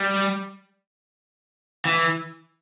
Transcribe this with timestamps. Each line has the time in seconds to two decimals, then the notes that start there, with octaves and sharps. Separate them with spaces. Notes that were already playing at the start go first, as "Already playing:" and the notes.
Already playing: G3
1.85 E3